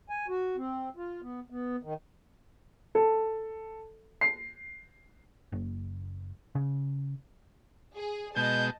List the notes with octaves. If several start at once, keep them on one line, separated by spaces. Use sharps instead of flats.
G#5
F#4
C4
F4
B3
B3
D#3
A4
C7
F#1
C#3
G#4
B2 G#3 D#5 A5 G6